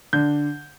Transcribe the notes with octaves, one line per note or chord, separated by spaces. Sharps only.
D3 G6